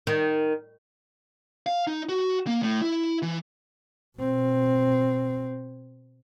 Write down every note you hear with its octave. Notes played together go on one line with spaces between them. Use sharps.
D#3
F5
D#4
F#4
A#3
A2
E4
E3
B2 C4